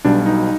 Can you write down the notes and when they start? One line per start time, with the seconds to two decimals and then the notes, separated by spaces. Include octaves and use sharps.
0.05 B1 B2 G3 D4
0.26 D#4